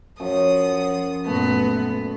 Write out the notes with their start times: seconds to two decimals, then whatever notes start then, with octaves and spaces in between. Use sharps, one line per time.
0.20 F#2 F3 D#6
1.26 F#2 A#2 A3 B3